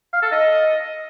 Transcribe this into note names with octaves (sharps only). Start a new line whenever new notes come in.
F5
A4
D#5